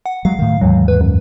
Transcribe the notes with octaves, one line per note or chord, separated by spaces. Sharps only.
F#5
F#3 G#3 F5
A2 D#3
D#2 G#2 E3 F#3
B4
F#2